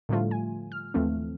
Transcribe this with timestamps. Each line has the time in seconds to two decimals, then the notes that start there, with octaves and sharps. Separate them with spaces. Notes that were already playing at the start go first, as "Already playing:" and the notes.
0.09 A2 D3 F3 G3 A3 F4
0.31 G#5
0.72 F6
0.94 D#2 E3 F3 A3 C4